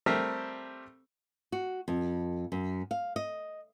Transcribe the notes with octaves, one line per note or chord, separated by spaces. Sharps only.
G3 A3 C4 G4 A#4 C5
F#4
F2
F#2
F5
D#5